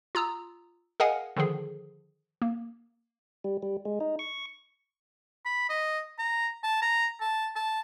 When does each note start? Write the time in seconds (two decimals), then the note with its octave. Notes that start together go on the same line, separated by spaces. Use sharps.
0.15 F4 A#5 D#6 E6
1.00 G#4 A#4 D#5 F5 F#5 G#5
1.36 D3 D#3 F3 G#4
2.42 A#3
3.44 G3
3.63 G3
3.85 G#3
4.01 D#4
4.19 C#6
5.45 B5
5.69 D#5
6.19 A#5
6.63 A5
6.82 A#5
7.21 A5
7.56 A5